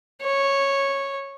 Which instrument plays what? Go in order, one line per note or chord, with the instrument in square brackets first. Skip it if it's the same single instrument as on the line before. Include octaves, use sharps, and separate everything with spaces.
[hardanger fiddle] C#5